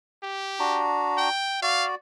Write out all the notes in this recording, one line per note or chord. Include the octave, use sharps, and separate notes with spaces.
G4
D4 F#4 A#5
G5
F#4 D5 F5